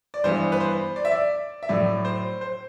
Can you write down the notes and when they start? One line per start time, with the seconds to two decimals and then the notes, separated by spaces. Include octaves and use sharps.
0.14 D5
0.24 G2 E3 B3 C5
0.52 B4
0.60 C5
0.96 D5
1.05 E5
1.12 D5
1.63 E5
1.69 A2 F#3 A3 D5
2.05 C5
2.41 C5